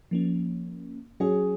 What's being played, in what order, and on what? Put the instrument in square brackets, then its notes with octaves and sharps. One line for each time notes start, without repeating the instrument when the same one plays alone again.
[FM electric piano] F3 A#3 C#4
[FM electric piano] F#3 C#4 F#4 C#5 [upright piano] G#4